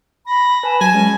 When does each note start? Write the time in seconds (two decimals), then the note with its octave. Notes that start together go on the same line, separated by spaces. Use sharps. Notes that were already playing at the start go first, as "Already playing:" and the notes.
0.26 B5 A#6
0.63 B4 G#5 A5 B5
0.81 F#3 G#5 A5
0.94 G#3 C#4